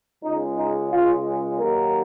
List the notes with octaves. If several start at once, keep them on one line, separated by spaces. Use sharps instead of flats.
C#2 C#3 G#3 D#4
D#4
F4
D#2 D#3 F#3 A#3 A#4